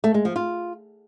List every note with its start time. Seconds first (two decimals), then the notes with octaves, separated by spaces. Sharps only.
0.04 A3
0.14 G#3
0.25 F3
0.36 F4